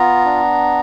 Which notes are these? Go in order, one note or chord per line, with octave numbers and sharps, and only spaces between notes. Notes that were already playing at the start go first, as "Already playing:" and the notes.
Already playing: B3 F4 A#5
D4